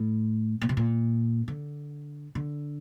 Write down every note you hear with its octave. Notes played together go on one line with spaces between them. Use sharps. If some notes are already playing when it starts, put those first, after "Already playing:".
Already playing: A2
A#2
C3
A#2
D3
D3